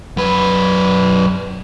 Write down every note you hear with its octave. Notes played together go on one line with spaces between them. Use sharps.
F#2 B4